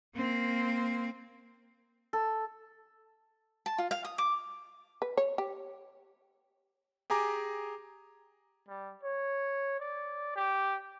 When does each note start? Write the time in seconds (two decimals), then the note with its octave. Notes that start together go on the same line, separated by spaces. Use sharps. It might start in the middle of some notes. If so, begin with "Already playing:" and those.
0.15 A#3 C4
2.13 A4
3.66 A5
3.78 F4
3.91 F5
4.05 D#6
4.18 D6
5.02 B4
5.17 C#5
5.38 G4
7.10 G4 G#4 G#5 A#5 D6
8.68 G3
9.04 C#5
9.80 D5
10.36 G4